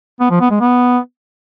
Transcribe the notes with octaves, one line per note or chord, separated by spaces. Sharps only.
B3
F3
B3
G#3
B3